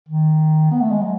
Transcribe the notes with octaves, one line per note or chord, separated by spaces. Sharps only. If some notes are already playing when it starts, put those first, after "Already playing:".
D#3
B3
A3
G#3
F#3